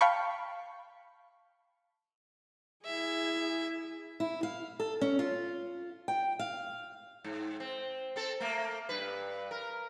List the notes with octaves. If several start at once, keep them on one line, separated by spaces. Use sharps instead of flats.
F5 G5 A5 B5 C#6
E4 G#4 E5
E4
F5
A4
C#4
F4
G5
F5
G#2
C4
C4 A4
A3 A#3
G2 B4
A#4